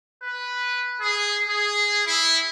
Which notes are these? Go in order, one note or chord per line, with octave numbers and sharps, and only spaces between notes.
B4
G#4
G#4
E4